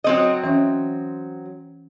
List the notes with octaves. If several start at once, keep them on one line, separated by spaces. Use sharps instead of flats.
F#3 C4 D#5
E3 C#4 C#5